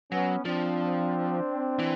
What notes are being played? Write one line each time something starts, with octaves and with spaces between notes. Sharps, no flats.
F#3 B3 C#4
F3 C4 D4
E3